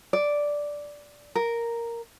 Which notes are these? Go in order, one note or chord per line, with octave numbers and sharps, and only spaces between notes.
D5
A#4